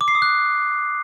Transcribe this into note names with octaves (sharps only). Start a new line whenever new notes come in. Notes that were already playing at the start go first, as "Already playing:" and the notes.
D6
C7
D#6
F#6